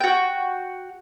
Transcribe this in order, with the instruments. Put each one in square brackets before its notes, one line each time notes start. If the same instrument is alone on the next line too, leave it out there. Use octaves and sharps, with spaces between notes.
[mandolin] F#4 G5